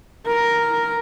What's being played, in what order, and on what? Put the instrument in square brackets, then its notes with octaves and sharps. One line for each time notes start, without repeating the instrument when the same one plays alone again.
[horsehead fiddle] A#4